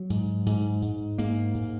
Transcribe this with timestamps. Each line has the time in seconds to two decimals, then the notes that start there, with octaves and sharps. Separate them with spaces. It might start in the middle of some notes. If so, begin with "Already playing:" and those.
Already playing: F#3
0.10 G#2
0.46 G#2
0.82 G#2
1.18 G#2 A#3
1.55 G#2